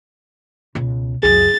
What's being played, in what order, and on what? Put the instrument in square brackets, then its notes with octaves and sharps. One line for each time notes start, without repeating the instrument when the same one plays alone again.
[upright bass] C#2 B2
[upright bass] C#2 F#2 [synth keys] G#4 [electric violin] A6